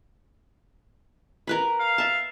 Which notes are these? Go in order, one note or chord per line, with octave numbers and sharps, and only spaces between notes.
A#4 B4 B5
F5
E5 A5